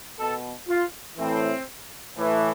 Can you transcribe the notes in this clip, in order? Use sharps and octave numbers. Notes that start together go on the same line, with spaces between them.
B2 A4
F4
A2 E3 C4
A2 E3